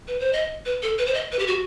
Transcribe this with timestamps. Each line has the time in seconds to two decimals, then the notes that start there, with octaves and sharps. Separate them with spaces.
0.08 B4
0.20 C5
0.33 D#5
0.65 B4
0.82 A4
0.98 B4
1.06 C5
1.14 D#5
1.32 B4
1.39 G4
1.47 F#4